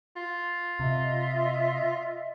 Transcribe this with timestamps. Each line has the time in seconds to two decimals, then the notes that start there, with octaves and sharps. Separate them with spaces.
0.16 F4
0.79 C3 D#5 E5